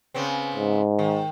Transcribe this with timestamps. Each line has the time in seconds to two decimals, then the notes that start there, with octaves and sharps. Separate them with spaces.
0.14 C#3 B3 C4
0.56 G#2
0.99 D#3